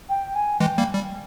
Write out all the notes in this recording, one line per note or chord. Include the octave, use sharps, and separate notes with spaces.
G5
G#5
E3 G#3 G5
G3 A#3
G3